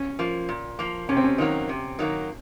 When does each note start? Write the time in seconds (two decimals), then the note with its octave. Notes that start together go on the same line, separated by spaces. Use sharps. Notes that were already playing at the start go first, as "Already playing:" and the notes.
Already playing: C#4
0.19 F3 A#3
0.49 A#2
0.79 F3 A#3
1.09 C3 C#4
1.17 C4
1.24 C#4
1.38 D#3 F#3 A#3
1.69 C3
1.99 D#3 F#3 A#3